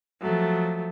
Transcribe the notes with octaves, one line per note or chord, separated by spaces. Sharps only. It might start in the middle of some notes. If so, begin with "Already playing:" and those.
F3 F#3 A3